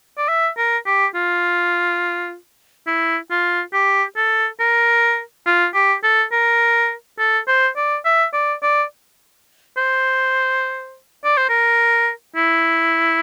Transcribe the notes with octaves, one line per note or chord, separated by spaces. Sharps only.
D5
E5
A#4
G4
F4
E4
F4
G4
A4
A#4
F4
G4
A4
A#4
A4
C5
D5
E5
D5
D5
C5
D5
C5
A#4
E4